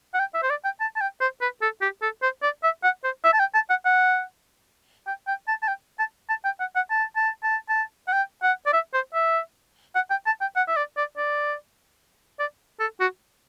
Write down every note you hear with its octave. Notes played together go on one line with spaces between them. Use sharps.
F#5
G5
E5
C5
D5
G5
A5
A5
G5
C5
B4
A4
G4
A4
C5
D5
E5
F#5
C5
E5
A5
G5
A5
F#5
F#5
G5
G5
A5
A5
G5
A5
A5
G5
F#5
F#5
A5
A5
A5
A5
F#5
G5
F#5
D5
E5
C5
E5
F#5
G5
A5
G5
F#5
E5
D5
D5
D5
D5
A4
F#4